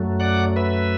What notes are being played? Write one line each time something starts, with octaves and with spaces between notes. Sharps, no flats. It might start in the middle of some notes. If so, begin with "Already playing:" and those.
Already playing: F#2 F#3 A3
D5 F#5
B4 E5